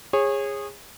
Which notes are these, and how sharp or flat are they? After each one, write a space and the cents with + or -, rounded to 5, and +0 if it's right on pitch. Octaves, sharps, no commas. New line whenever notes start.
G#4 -20 C#5 -25